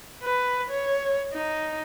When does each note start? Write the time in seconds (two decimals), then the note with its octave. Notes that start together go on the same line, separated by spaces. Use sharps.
0.23 B4
0.70 C#5
1.33 D#4